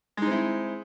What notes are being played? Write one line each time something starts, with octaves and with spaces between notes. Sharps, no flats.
G#3 C4 D#4 E4